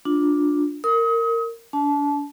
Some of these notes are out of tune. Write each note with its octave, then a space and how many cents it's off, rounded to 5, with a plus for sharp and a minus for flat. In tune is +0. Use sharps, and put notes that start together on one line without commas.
D4 +0 F4 +20
A#4 -20 D#6 +35
D4 -35 A5 -25